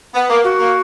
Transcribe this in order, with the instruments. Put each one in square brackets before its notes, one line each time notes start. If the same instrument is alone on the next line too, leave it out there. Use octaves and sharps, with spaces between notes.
[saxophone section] B3
A#3
[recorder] F#4
[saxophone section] A#3